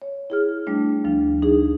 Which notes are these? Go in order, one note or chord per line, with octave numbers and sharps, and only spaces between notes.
C#5
E4 G#4 F6
G3 A3 D4
D2 F3 D4
D#4 G#4